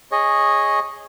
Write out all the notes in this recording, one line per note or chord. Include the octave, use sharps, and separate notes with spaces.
G#4 C#5 D#5